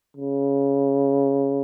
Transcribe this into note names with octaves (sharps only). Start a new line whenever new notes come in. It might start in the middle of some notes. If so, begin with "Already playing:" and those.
C#3